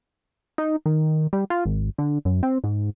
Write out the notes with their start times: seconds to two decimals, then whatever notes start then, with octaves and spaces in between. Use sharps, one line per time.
0.58 D#4
0.86 D#3
1.33 G3
1.50 F4
1.66 G#1
1.98 D3
2.25 F#2
2.43 C4
2.64 G#2